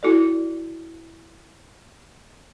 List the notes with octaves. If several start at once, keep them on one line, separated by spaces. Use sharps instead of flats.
E4 F#4 A4 D5